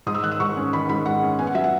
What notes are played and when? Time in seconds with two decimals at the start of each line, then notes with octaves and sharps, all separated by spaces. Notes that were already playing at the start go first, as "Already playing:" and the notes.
0.07 G#2 D#6
0.15 E6
0.23 D#3 F#6
0.31 E6
0.40 G#2 C#6
0.57 C#4
0.73 D#3 B5
0.89 G#2 B5
1.06 G#3 F#5
1.23 C#4
1.39 B3 G#5
1.47 F#5
1.55 F#3 E5
1.64 F#5